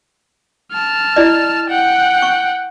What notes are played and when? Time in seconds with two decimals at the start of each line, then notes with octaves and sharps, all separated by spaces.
0.72 A5 F6
1.16 E4 D5 D#5
1.70 F#5 G5
2.22 C#6